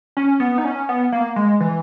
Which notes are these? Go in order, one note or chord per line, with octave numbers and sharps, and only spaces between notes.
C#4
B3
D#4
C#4
B3
A#3
G#3
E3